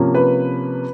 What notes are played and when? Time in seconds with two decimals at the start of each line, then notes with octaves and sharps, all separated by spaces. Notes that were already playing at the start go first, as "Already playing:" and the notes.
Already playing: C3 F3 A#3 C#4
0.15 B4